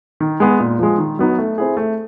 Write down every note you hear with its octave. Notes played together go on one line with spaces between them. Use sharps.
D#3
G#3 B3
A#2
F3 G#3
D#3
F#3 B3 D#4
A3
C4 E4 G#4
A3